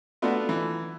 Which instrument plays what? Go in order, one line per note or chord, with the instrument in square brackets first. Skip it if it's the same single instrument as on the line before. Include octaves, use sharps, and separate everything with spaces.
[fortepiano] A3 B3 D4 F4 F#4
E3